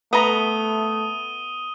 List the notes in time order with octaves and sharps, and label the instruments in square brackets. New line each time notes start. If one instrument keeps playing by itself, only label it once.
[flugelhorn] A3 [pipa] B3 A#5 [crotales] D#6 D#7 G7